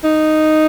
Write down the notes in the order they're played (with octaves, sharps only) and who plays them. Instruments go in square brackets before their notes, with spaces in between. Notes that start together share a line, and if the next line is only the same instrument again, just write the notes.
[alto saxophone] D#4